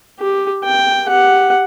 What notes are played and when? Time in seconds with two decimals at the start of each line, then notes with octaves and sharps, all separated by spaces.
0.20 G4
0.65 G5
1.06 G4 F#5